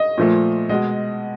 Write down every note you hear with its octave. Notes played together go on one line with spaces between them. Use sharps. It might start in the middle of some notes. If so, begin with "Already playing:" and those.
Already playing: D#5
A#2 F3 A3
B2 G#3 D#5